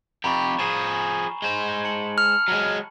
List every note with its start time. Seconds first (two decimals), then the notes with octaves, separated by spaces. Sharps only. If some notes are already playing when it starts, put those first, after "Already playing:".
0.24 F2 G4 A#5 B5 C#6
0.59 F3 G#4 G#5 C7 E7
1.42 G#3 C5
1.84 A5 C#7 F#7
2.18 F6
2.48 F#3 G#3